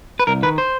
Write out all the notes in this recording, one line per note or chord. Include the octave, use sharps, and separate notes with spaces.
B4
C2 A#4
D#3 B4
C5